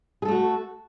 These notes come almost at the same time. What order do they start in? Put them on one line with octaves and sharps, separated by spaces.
G#4 A4 A3 F#4